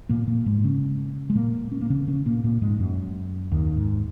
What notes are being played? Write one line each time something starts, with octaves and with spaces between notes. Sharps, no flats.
A#2 A#3
A#2 A#3
G#2 G#3
C#3 C#4
G#3
A#2 A#3
C#4
A#3
C#3 C#4
C#3 C#4
A#2 A#3
A#2 A#3
G#2 G#3
F#2 F#3
D#2 D#3
G#2